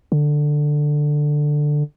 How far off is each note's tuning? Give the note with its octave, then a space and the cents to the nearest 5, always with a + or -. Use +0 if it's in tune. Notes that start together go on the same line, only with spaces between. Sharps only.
D3 +10